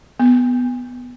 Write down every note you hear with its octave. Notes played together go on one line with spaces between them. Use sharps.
B3